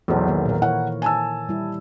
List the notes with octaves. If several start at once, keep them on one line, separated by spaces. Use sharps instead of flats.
B1 E2 A4 C5
D#3 E3 A#3
A#2 A#4
E4 C#5 F#5
G#5 A5 E6
G3 E4